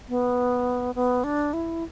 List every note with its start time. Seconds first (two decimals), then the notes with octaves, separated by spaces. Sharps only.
0.09 B3
0.95 B3
1.24 D4
1.53 E4